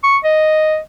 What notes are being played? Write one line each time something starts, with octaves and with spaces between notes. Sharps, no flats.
C#6
D#5